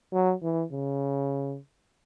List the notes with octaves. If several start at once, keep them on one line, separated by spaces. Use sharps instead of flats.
F#3
E3
C#3